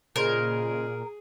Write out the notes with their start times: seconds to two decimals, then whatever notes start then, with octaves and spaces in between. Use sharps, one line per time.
0.16 A#2 C#3 G#4 A#4 C5 D#5